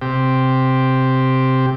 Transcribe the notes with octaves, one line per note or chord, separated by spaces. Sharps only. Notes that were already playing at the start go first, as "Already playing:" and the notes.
C3 G4